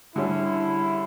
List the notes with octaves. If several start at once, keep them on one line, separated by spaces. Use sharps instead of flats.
D3 G3 C#4 E4